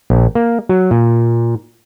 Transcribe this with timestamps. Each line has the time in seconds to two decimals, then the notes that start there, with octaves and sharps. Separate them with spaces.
0.10 A#1
0.35 A#3
0.69 F#3
0.91 A#2